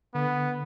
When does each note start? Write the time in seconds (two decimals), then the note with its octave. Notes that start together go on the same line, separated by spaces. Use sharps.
0.14 D3 B3